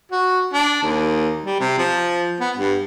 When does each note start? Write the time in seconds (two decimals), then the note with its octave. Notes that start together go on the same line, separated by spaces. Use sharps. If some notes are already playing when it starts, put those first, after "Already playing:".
0.12 F#4
0.53 D4
0.83 D#2
1.46 G3
1.60 C3
1.78 F3
2.40 B3
2.57 G2